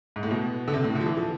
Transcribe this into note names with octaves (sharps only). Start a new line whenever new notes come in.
G#2
A2
B2
D3
C3
A2
D3
F3
E3
F3